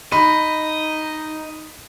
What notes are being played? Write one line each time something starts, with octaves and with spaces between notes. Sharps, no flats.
D#4 D#5 B5